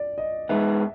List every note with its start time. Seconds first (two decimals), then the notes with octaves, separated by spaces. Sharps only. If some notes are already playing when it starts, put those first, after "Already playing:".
Already playing: D5
0.18 D#5
0.49 G#3 B3 D#4 E5